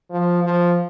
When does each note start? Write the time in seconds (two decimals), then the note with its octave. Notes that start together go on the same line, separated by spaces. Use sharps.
0.10 F3
0.44 F3